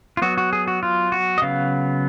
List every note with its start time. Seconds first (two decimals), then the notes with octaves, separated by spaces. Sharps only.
0.17 F4
0.22 F#3 B3 F#4
0.38 F#4
0.53 G#4
0.68 F#4
0.83 F4
1.12 F#4
1.38 D#5
1.42 C#3 F#3 B3 F5